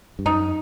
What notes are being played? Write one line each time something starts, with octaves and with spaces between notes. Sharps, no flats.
G2
F#2 D#4